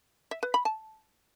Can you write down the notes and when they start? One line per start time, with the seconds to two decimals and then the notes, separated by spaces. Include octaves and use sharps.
0.31 E5
0.43 B4
0.54 B5
0.65 A5